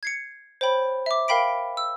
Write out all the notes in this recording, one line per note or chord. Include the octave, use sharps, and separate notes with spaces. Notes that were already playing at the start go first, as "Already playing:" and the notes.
G#6 C7 C#7
C5 C#5 G5 B5
E5 D6
A#4 F5 G5 B5 B6 D7
E6